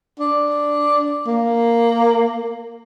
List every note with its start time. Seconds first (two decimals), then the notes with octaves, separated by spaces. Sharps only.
0.19 D4
1.27 A#3